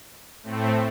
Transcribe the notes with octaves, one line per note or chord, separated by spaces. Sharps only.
A2 A3 C4